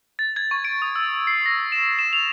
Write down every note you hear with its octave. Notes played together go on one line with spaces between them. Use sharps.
A6
G#6
C#6
D7
D#6
E6
C7
A#6
E7
E7
F7